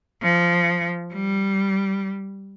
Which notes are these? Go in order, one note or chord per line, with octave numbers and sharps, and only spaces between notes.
F3
G3